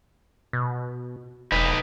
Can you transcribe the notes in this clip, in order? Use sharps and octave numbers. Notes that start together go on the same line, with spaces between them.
B2
E1 D#4 B4